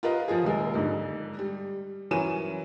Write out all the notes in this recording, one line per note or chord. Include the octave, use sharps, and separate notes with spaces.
F4 G4 A#4 B4 D#5 F5
F3 F4 G#4
D#1 C3 G#3 A#3
G#2 D3
G3
E3 F#3 C#4 A#4 D#7 E7